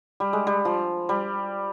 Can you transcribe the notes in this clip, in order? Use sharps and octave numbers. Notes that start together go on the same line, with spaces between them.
G3
G#3
G3
F3
G3